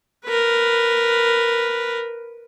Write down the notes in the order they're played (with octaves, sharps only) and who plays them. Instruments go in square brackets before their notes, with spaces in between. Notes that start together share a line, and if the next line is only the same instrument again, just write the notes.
[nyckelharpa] A#4 B4